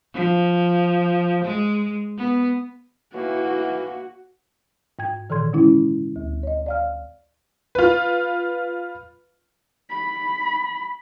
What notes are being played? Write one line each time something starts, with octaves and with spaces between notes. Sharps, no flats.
F3
G#3
B3
A2 E3 A#3 F#4
G#2 G5 G#6
A#2 D#3 E3 A4 C6 G#6
D3 G#3 C#4 E4
D2
C#5 D#5
D5 F5 F6
F4 B4
B5